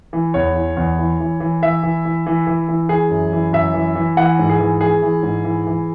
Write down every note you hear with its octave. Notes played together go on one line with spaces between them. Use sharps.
E3
E2 C#5
E3
E2
E3
E3
E3
E3 E5
E3
E3
E3
E3
E3
E3 G#4
F#2
E3
F#2 E5
E3
E3
E3 F#5
G#2
G#4
E3
E3 G#4
E3
G#2
E3
E3